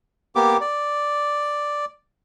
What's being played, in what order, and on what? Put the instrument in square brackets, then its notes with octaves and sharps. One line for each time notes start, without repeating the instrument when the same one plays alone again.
[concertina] A#3 B3 G4 D6
D5